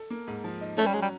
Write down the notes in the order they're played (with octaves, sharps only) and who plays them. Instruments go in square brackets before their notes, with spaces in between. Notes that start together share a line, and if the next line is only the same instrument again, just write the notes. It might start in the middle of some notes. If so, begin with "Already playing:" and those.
Already playing: [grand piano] A4
A#3
G#2
F3
D#4
[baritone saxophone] A3 [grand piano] C#4
[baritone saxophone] G3
[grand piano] F#3 [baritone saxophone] G#3
[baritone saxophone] G3